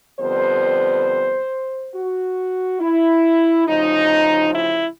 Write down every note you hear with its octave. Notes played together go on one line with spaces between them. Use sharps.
F2 D3 G3 B3 C5
F#4
E4
D2 C#3 F3 D#4
E4